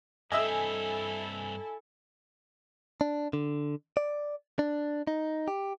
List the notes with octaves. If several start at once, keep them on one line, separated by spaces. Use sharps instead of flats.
G2 C4 E4 A4 D#5 E5 G#5 E6
D4
D3
D5
D4
D#4
G4